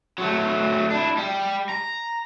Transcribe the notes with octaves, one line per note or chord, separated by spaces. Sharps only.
F#3 A3
D4 E4
G3
A#5